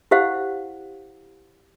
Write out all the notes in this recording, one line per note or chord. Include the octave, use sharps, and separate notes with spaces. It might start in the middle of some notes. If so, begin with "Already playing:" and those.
E4 G4 C5 F5 F#5